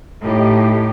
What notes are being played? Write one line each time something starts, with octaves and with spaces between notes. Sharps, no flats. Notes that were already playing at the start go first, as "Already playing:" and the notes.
A2 D#4 G4